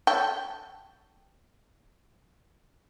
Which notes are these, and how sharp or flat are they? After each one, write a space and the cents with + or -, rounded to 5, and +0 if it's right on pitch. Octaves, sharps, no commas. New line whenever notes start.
A4 +0 C#5 +30 G5 +0